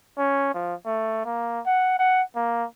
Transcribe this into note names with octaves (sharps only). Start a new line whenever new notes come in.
C#4
F3
A3
A#3
F#5
F#5
A#3